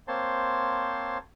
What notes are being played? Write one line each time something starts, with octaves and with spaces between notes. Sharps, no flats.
A#3 C4 C5 C#5 A5 C6